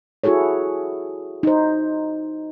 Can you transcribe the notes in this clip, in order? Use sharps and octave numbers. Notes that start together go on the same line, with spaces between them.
E4 F#4 G#4 A4 C#5
D#4 C5